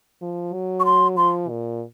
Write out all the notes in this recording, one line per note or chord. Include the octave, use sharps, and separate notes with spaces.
F3
F#3
C#6
C6
F3 C6
A#2